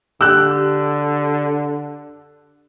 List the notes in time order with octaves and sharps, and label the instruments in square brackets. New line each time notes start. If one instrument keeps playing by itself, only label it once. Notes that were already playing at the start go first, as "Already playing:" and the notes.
[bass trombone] D3 [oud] G4 [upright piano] E6 F#6